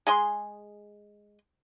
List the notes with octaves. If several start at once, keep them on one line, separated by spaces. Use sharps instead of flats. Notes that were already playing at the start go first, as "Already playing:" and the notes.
G#3 G#4 C6